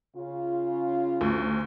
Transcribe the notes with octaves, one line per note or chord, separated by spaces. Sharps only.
C#3 F4
D2